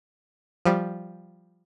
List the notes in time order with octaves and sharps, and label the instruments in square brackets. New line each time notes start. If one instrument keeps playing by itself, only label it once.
[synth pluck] F3 G3